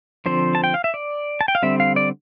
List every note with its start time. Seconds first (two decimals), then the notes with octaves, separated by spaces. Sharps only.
0.26 D3 F3 C4 C5
0.55 A5
0.64 G5
0.74 F5
0.84 E5
0.94 D5
1.41 A5
1.48 G5
1.55 F5
1.62 D3 G3 C4 E5
1.80 F5
1.96 D5